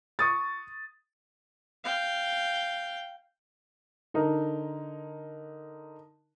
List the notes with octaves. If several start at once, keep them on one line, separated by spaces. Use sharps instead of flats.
C#6 D#6 A6
F5 G5
D3 D#4 A#4